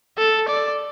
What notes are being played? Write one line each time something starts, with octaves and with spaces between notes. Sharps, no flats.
A4
D5